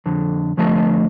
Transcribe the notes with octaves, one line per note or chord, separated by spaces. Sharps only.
F2 D3
F2 D3 F3 A3 D#5 A5